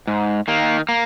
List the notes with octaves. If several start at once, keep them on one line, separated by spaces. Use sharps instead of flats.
G#2
D#3 A#3
A#3